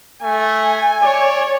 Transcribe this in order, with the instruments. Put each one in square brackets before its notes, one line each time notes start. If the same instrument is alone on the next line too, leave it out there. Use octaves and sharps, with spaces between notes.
[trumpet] A3 [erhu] G#5
[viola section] C#5 [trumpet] D5